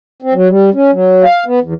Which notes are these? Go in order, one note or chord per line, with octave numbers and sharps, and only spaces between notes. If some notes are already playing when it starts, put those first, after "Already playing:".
C4
F#3
G3
C#4
F#3
F5
B3
E2